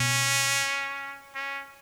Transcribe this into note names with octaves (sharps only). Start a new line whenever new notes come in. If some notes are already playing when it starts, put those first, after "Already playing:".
Already playing: B2 C#4
C#4